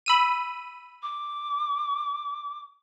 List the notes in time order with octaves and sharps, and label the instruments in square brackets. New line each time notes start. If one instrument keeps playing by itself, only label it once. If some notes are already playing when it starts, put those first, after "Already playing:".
[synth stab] B5 E6 D#7
[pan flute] D6